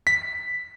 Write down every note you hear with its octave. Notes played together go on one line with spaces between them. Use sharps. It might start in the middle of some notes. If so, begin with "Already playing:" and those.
B6